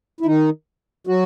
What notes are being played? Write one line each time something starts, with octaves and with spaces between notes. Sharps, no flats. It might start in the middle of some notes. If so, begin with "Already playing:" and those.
E4
D#3 D#4
F#3 F#4